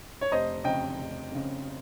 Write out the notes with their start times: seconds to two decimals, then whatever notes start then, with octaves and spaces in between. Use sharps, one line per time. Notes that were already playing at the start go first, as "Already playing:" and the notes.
0.21 C#5
0.32 F1 C5 D#5
0.64 F2 C#3 D#5 G5
0.98 F1
1.31 F2 C#3